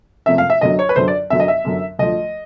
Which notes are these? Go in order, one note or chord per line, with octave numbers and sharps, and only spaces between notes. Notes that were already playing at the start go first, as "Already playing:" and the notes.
F#1 F2 C3 F3 A3 E5
F5
E5
F#2 D3 F#3 D#5
C#5
B4
F#2 D3 F#3 C5
D5
F#2 D3 F#3 E5
D#5
E5
F#2 D3 F#3
D2 D3 F3 D#5